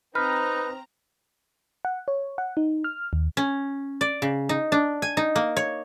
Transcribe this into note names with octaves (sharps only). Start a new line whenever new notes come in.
C4 D#4 B4 A#5 F6
F#5
C#5
F#5
D#4
F6
D#2
C#4
D5
C#3
D#4
D4
G#5
D#4
A#3
C#5